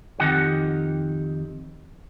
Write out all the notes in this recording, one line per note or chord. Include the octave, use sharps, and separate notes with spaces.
F2 D#3 D#4 G4 F#5